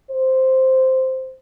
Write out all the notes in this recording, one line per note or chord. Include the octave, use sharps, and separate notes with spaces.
C5